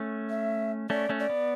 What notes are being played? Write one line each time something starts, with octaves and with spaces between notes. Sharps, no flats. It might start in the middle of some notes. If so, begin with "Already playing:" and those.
Already playing: A3 C#4
E5
A3 C#4 D5
A3 C#4
D5
B3